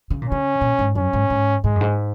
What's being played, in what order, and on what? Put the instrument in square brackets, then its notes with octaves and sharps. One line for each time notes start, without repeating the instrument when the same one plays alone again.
[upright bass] C#3
A#2
[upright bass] C#3 [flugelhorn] C#4
[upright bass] A#2
G#2
[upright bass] F#2 [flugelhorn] C#4
[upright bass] G#2
G#2
[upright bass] G#2 [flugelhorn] G#3
[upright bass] F#2
G#2